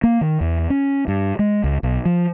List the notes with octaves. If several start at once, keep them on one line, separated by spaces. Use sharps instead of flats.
A#3
D#3
E2
C#4
G2
G#3
C#2
B1
F3